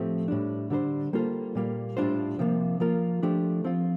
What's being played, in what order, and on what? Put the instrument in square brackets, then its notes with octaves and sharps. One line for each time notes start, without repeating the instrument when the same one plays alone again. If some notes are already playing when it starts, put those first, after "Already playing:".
Already playing: [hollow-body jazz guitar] A2 F3 A3 C4 G4
A2 G3 D4
D3 G3 D4 A4 C5
G3 A#3 F4 A4 C5
A#2 G3 A#3
A2 G3 D4 F4 C5
C3 F3 A#3
F3 A#3 F4 A#4
F3 A3 D4 G4
F3 C4 F4